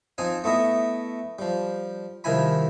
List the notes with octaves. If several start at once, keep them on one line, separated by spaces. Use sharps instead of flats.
F3 C4 D#4 G#5
A3 B3 E4 D#5
F3 G3
C2 D#3 F3 E4 G#5 B5